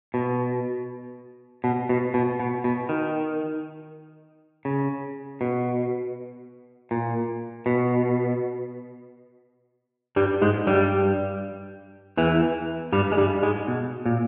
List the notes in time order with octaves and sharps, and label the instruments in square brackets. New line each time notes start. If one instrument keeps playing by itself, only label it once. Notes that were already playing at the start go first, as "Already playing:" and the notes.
[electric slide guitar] B2
B2
B2
B2
B2
B2
D#3
C#3
B2
A#2
B2
G2 G3
G#2 G#3
G2 G3
E2 E3
G2 G3
G#3
G2 G3
G#2 G#3
B2
A#2